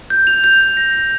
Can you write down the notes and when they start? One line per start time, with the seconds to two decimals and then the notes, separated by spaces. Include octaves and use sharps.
0.10 G6
0.27 F7
0.44 G6
0.61 G6
0.77 A#6
0.94 G6